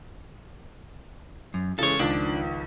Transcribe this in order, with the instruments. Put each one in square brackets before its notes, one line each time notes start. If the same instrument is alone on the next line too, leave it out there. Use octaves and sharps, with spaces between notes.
[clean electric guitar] F#2
[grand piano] C#3 E3 G#3 [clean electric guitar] A4 C#5
[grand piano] C#2 D#3 F3 [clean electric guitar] D4